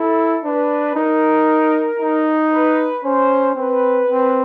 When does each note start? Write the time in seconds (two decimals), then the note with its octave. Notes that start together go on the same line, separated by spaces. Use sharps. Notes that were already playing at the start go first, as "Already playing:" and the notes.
Already playing: E4 A4
0.44 D4 B4
0.95 D#4 A#4
2.00 D#4
2.51 B4
3.03 C#4 C5
3.55 C4 B4
4.08 C4